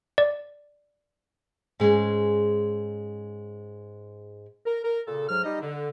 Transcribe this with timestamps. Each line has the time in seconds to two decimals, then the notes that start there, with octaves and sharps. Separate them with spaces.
0.18 D5
1.80 G#2 G#3 C#4 G#4
4.66 A#4
4.84 A#4
5.07 A#2 C#3 A4
5.29 G#2 F#3 F6
5.44 G3 D#4 D#5
5.61 D3